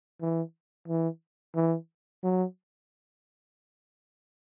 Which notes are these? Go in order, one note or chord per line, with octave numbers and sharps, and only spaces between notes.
E3
E3
E3
F#3